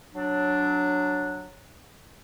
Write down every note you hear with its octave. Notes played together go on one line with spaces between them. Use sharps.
F#3 D4